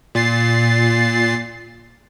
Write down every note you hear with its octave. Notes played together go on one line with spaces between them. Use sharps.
A#2 A6 C7